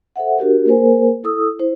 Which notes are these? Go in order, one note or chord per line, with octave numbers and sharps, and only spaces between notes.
A4 C5 E5 F#5
D4 F#4 G4 A#4
A#3 G#4 A#4 C5 G#5
E4 A4 D#6 E6
E4 C5